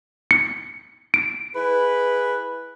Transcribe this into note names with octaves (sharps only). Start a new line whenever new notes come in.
C#7
D7
E4 G#4 B4